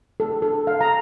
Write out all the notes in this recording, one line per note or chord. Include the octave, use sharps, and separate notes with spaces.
A4
A4
F5
A#5